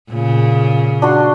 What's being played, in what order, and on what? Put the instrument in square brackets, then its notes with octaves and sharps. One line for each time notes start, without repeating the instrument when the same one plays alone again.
[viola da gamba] A#2 C#3
[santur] D4 F#4 C6